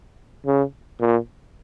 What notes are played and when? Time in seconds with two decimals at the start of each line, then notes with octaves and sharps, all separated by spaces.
0.46 C#3
1.00 A#2